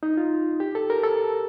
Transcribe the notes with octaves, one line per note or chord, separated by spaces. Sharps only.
D#4
F4
G4
A4
A#4
A4